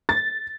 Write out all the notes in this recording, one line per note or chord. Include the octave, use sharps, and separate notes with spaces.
A6